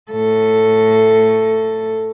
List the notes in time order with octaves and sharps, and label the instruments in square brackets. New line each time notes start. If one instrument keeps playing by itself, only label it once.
[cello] A2 A4